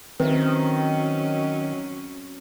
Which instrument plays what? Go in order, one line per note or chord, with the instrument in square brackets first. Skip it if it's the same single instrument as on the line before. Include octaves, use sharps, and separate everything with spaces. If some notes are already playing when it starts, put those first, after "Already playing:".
[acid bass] D#3 [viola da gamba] F#3 C#4 [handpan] C4 [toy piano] B4 E5